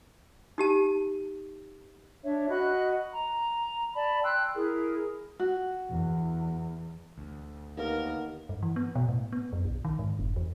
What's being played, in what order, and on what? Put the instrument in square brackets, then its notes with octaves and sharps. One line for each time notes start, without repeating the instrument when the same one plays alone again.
[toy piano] D#4 G4 A5
[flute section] D4 C#5 E5
F#4 D#5 B5 F#6
A#5
D5 A5 B5
G5 C6 E6 F#6
E4 G#4 A#4
[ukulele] F#4
[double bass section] E2
[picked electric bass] D2
[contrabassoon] D#2 [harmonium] A#3 B3 [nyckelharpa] A#4
[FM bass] G2
E3
B3
B2
A2
B3
F#2
B1
D#3
G#2
F1
E2